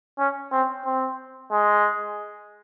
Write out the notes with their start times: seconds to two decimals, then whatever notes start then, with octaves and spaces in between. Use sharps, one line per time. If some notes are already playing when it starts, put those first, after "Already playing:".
0.18 C#4
0.52 C4
0.85 C4
1.52 G#3